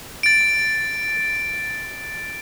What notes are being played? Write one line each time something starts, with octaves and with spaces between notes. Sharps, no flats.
A6 D7